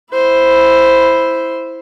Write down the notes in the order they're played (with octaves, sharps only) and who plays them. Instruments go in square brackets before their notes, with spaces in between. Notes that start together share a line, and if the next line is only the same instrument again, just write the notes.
[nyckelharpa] E4 C5